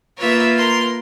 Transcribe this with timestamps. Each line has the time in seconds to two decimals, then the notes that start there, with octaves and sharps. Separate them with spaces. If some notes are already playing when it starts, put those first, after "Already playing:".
0.18 A#3 F4 B4 C#5 E5
0.57 A#4 C6